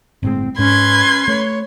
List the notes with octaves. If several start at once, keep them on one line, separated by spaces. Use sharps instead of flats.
G1 A2 G#3 C4
G#2 C#4 B4 C6 G#6
A3 C#5